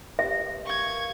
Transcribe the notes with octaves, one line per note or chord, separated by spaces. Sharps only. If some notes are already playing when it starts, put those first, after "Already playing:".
G4 B4 E5
G4 A#4 F5 C#6 G#6